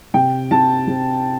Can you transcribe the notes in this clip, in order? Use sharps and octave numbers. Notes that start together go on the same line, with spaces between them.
C3 G5
C3 A5
C3